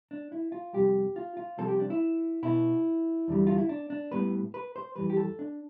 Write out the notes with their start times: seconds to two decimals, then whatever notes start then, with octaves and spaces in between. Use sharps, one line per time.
0.11 D4
0.32 E4
0.52 F4
0.73 F2 C3 G3 G4
1.16 F4
1.37 F4
1.57 C2 C3 F3 C4 A4
1.68 G4
1.80 D4
1.90 E4
2.43 B2 B3 E4
3.28 E2 D3 G3
3.47 F4
3.58 E4
3.69 D4
3.90 D4
4.11 A2 G3 B3 B4
4.54 B4
4.76 C5
4.96 F2 E3 G3 B4
5.10 G4
5.17 A4
5.39 D4